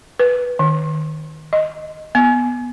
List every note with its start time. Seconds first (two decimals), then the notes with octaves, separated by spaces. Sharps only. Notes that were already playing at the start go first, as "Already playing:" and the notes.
0.19 B4
0.59 D#3
1.53 D#5
2.15 B3